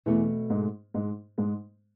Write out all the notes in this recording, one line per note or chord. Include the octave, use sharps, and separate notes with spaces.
E2 B2 E3 A3 C4
G#2 G#3
G#2 G#3
G#2 G#3